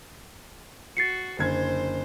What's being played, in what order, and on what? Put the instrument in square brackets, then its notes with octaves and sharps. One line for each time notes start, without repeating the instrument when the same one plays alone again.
[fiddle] F#4 [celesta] A6 C7 C#7
[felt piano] F#1 D3 G#6 [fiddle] C5